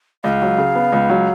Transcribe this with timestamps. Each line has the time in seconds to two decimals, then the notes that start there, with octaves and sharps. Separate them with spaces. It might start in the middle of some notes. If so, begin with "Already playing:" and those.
0.24 C#2 F5
0.42 F#3
0.58 C#3
0.75 B3
0.92 C#2
1.09 F#3